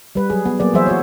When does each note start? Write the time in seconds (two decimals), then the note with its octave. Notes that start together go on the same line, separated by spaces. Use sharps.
0.15 G3 B4
0.30 F#3 G#4
0.45 B3
0.60 F#3 A#3 B3 G#4 D5
0.74 E3 F#3 G#4 C5 E5
0.86 F#4 C#5